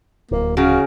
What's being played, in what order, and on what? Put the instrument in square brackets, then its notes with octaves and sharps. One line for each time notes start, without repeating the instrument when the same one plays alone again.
[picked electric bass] D1 [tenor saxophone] A#3
[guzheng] C#3 A#4 F5 [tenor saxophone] F#4